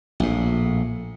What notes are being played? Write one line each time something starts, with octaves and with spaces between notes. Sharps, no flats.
A#1 A2